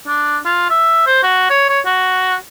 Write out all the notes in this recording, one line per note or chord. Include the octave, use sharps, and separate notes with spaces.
D4
F4
E5
C5
F#4
C#5
C#5
F#4